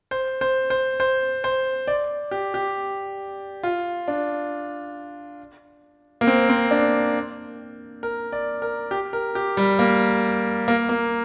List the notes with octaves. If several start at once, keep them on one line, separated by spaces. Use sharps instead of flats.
C5
C5
C5
C5
C5
D5
G4
G4
F4
D4
A#3
C4
C4
D4
A#4
D5
A#4
G4
A#4
G4
G3
A#3
A#3
A#3